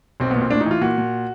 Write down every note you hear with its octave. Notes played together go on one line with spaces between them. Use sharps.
B1 C4
B3
A#2
C4
A2 D4
D#4
E3 F4
A#2 F#4
A#2